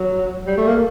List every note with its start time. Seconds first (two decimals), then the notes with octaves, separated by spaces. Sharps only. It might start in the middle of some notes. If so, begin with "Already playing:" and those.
Already playing: F#3
0.47 G3
0.57 A3
0.67 A#3